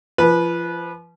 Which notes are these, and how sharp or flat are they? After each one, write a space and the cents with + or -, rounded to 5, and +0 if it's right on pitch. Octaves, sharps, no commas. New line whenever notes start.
F3 -35 B4 -15